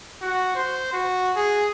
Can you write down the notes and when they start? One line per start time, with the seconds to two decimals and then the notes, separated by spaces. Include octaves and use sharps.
0.22 F#4
0.55 C5
0.93 F#4
1.36 G#4